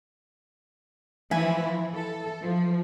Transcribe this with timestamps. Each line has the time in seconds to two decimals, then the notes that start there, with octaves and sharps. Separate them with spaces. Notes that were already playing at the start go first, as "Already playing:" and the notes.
1.31 E3 F3 E4 B4 E5 G#5
1.61 E3
1.94 A4
2.41 F3